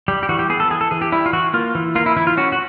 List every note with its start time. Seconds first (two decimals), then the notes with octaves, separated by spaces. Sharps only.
0.08 G3 G4
0.23 G4
0.29 E3 F#4
0.39 G4
0.49 B3 G#4
0.60 A4
0.71 E3 G#4
0.81 A4
0.91 E3 G#4
1.02 G4
1.12 G3 E4
1.26 F4
1.33 E3 F#4
1.53 A#3 F4
1.75 E3
1.95 A#3 F4
2.06 E4
2.17 E3 E4
2.27 F4
2.37 C#4 F#4
2.52 F#4